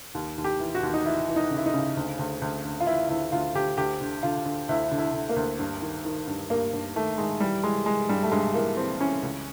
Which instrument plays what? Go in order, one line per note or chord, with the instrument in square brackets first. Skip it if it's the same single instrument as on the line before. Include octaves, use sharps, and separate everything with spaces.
[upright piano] D#2
D#2
G4
E3
F#4
D#2
D#4
E3 E4
E3
D#4
C#3
E4
D#4
C#3
D2
D2
D2
D2
F4
E3 E4
D2 E4
D2 F4
D2 G4
D2 G4
D3
D3 F4
D3
D2 E4
D3
E4
D3
A#3
D2
G2
D#3
D#3
G2
G2 A#3
G2
D#3 A3
D#3 G#3
E3 G3
E3 G#3
E3 G#3
G2 G3
A3
G2 G#3
E3 A#3
E3 C4
E3 C#4
C#2